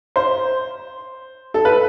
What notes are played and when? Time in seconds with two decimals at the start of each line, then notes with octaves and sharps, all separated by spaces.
0.16 C5
1.54 A4
1.65 B4